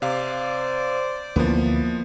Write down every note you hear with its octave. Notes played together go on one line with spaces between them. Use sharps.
C3 C5 D5 F5
D2 E3 F3 A#3 B3